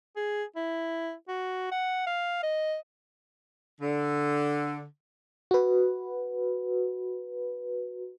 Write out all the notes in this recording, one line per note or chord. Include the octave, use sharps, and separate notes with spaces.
G#4
E4
F#4
F#5
F5
D#5
D3
F#4 B4